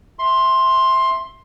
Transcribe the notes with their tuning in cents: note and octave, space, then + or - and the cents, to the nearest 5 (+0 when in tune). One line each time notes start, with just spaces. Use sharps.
E5 +0 C6 +10